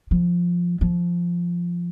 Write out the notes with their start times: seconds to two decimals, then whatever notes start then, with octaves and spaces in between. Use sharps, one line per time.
0.11 F3
0.81 F3